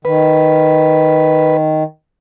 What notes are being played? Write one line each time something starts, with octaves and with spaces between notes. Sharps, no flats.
D#3 B4